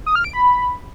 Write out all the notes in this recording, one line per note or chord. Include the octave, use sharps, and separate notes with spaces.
D#6
F6
D7
B5